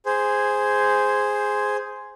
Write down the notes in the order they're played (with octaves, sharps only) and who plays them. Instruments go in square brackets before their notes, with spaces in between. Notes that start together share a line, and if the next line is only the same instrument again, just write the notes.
[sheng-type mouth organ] G#4 C5